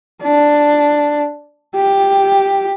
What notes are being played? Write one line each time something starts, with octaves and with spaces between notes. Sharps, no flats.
D4
G4